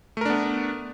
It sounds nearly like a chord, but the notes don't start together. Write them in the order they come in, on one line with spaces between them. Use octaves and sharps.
A3 A#4 D4 B3